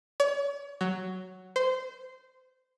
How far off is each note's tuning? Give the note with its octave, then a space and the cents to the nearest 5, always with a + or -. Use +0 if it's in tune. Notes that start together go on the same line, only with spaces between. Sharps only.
C#5 +40
F#3 +5
C5 -20